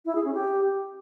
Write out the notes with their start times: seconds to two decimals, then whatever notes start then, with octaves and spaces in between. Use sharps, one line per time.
0.06 E4
0.15 G#4
0.25 C#4
0.34 G4